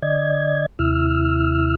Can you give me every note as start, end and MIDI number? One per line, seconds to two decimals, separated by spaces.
0.02 0.66 50
0.02 0.66 74
0.02 0.66 75
0.02 0.66 92
0.79 1.75 39
0.79 1.75 48
0.79 1.75 64
0.79 1.75 88
0.79 1.75 89